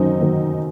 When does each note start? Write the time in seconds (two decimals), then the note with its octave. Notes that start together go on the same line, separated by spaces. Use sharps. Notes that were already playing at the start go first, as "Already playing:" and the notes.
Already playing: F#2 D#3 F#3 C4 D#4
0.20 D#3 F#3